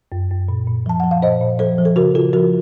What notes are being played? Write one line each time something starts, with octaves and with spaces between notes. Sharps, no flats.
F#2
F#2
A#2
A#2
F3 A5
F3 F#5
F5
A#2 C5 D#5
A#2
F3 A4 C5
F3
A4
C#3 F#4 A#4
C#3 F4 A4
F3 F#4 A#4